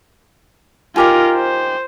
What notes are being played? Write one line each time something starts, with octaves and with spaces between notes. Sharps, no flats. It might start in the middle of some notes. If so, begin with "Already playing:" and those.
D#4 F4 G4 A#4 G#5
C5